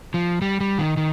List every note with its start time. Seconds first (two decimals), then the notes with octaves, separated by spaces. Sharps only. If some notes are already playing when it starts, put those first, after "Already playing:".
0.14 F3
0.42 G3
0.60 G3
0.78 D#3
0.97 D#3